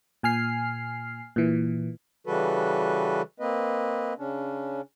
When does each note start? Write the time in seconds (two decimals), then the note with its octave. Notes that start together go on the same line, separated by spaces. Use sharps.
0.23 A#2 G#5 F6 C7
1.36 A#2 E3
2.27 C#3 E3 G3 F#4 A4 B4
3.40 A#3 C4 B4 D#5
4.18 C#3 C#4 D4